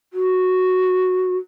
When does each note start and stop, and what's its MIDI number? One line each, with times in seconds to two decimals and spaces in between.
0.13 1.37 66